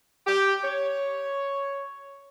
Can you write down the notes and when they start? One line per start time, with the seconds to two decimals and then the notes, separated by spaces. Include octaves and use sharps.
0.27 G4
0.64 C#5